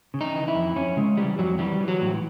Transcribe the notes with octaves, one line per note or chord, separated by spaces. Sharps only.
C#3
D#4
E3
E4
F2
F2 C#4
C#3 G#3
E3 G3
F2 F#3
E3 G3
E3
F#3
A2